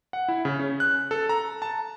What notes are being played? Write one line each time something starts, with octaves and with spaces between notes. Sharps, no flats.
F#5
E4
C#3
C#4
F#6
A4
A#5
A5